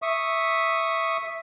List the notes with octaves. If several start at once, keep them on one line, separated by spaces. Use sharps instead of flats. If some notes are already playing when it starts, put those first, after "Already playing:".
E5 C#6 D#6